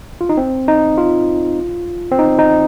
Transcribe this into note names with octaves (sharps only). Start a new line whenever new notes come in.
F4
D#4
C4
D#4
F4
C4
D#4
D#4